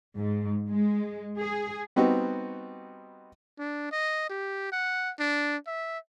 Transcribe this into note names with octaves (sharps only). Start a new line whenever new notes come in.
G#2
G#3
G#4
G3 B3 C4 D#4 F#4
D4
D#5
G4
F#5
D4
E5